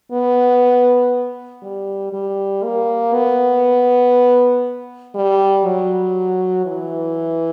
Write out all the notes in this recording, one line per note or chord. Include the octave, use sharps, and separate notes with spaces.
B3
G3
G3
A#3
B3
G3
F#3
E3